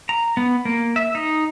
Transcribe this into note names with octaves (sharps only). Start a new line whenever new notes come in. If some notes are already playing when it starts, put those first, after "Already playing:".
A#5
B3
A#3
E5
D#4